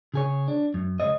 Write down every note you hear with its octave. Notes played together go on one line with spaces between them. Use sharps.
C#3 G#4 C#5
D4
F#2
C#2 G#3 C#5 D#5